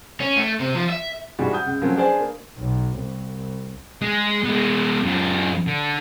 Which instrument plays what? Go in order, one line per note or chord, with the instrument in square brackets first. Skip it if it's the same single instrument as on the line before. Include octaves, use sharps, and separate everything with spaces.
[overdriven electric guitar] C#4
A3
C3
F3
E5
[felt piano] G#2 E3 G3 G#3 F#4
F#5 D#6 G6
C#2
F3 F#3 A3 A#3 C4 C#4
D4 G#4 B4 C5 D5 G#5
A#3
[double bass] B1
C2
[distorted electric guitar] G#3
G#3 B3
F#2 F4
D3